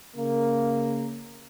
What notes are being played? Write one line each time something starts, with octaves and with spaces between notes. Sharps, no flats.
C#3 A#3